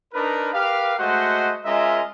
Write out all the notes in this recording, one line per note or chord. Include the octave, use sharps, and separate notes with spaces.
D4 D#4 A#4 B4
G4 A#4 B4 F5
G#3 A3 F#4 C5 D#5 F#5
G#3 C#4 F4 A#4 D#5 E5